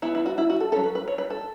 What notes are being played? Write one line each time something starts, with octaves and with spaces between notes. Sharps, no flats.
E3 B3 E4
E4
F#4
E4
F#4
A4
F#3 C#4 A4
B4
B4
C#5
B4
A4